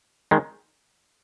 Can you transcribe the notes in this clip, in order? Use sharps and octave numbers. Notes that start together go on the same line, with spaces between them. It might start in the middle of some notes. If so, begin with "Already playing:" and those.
D#3 G#3